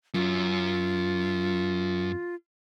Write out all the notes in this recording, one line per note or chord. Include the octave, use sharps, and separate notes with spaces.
F#2 F4